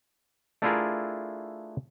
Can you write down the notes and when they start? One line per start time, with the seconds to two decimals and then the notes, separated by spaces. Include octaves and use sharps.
0.62 A3 D4 E4 F4 G#4 A#4